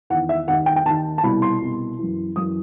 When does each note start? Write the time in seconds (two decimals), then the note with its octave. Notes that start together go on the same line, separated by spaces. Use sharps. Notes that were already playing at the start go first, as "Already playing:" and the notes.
0.10 E2 D#3 F#5
0.29 E5
0.47 D#2 D#3 F#5
0.66 G5
0.76 G5
0.85 D#2 D#3 A5
1.18 A5
1.23 C2 B2 B5
1.42 C6
1.61 C2 B2
1.99 F#2 E3
2.36 F#2 E3 D#6